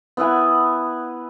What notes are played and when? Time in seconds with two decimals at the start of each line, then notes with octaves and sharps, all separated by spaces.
0.17 B3 E4 F#5 G#5